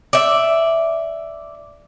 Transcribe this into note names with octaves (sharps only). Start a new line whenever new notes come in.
D5 E5